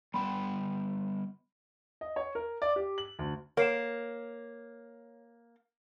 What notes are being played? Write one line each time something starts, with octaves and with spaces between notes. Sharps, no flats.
G3 B3 G5 B5 C6
D#5
C#5
A#4
D5
G4
F#7
D2
A#3 C#5 C7 E7